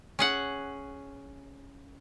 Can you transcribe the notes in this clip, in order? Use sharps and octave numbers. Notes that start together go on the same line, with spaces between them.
C#4 G#4 F#5